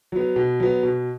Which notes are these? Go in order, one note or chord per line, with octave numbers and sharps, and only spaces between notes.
F#3 B3
B2
F#3 B3
B2